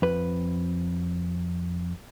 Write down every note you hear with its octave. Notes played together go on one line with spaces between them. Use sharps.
F2 B4